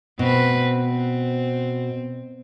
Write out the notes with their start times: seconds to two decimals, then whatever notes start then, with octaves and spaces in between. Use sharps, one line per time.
0.19 B2 C4 B4
0.78 C4